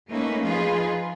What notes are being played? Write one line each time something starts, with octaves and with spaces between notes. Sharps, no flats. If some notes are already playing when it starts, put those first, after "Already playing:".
A3 A#3 C#4 D#4 B4
F3 D#4 F4 G#4 B4